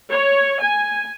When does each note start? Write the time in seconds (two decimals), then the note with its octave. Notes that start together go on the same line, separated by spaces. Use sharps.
0.11 C#5
0.60 G#5